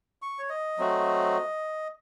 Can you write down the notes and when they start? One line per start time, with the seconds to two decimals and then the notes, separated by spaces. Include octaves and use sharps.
0.22 C#6
0.39 C#5
0.49 D#5
0.78 F#3 A3 C4 F#4